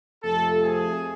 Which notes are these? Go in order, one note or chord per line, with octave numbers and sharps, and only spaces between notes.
F2 C3 F3 A3 A4
G#4